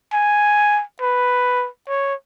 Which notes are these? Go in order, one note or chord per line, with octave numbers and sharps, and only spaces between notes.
G#5
B4
C#5